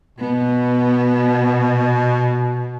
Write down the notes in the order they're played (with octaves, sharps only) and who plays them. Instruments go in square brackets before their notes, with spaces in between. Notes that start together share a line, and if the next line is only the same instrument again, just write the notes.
[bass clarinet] B2 [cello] B3